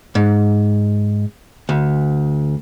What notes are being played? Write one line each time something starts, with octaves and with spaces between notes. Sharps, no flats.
G#2
D2